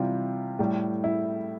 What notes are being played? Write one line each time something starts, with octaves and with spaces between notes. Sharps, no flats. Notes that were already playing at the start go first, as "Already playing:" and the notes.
Already playing: C3 E3 G3 F4
A2 G3
E4